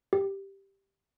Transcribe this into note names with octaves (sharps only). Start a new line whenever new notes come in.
G4